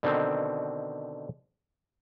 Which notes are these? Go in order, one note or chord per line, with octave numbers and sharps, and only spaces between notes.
B2 D3 D#3 C4